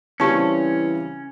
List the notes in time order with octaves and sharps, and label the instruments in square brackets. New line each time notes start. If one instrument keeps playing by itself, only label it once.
[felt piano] C#3 G3 C4 [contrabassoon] E3 [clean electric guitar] C#4 [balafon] A5 C#6